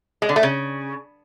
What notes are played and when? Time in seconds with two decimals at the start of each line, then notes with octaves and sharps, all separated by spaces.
0.22 G#3
0.29 D3
0.36 A3
0.43 C#3